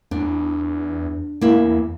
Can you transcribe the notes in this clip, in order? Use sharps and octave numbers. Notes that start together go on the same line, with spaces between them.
E2 D4
E2 A#3 E4